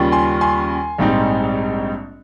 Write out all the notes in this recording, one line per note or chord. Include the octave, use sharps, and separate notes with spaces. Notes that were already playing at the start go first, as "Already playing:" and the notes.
Already playing: D#2 C#3 G3 C#4 F4
G#5 C6
G#5 C6
A#1 G#2 G3 C4 D#4